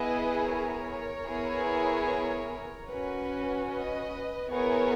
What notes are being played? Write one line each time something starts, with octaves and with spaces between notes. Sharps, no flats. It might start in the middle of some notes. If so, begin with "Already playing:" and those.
Already playing: B3 E4 G#4 B4 D#5
A#4 C#5
B3 E4 G#4
C#4 F#4 B4
B4 D#5
B3 E4 G#4 A#4 C#5